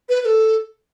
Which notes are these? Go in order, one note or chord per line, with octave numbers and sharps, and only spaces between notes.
B4
B4
A4